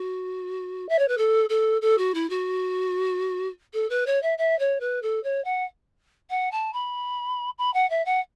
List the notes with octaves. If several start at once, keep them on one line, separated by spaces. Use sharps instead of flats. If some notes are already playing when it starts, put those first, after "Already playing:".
Already playing: F#4
E5
C#5
B4
A4
A4
A4
F#4
E4
F#4
A4
B4
C#5
E5
E5
C#5
B4
A4
C#5
F#5
F#5
A5
B5
B5
F#5
E5
F#5